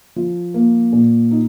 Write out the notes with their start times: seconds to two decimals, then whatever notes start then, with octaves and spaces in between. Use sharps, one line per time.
0.16 F3
0.54 A#3
0.93 A#2
1.31 D#4